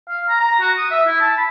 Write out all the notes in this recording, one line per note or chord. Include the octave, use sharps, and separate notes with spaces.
F5
A#5
A#5
F#4
D#6
E5
E4
A5
B5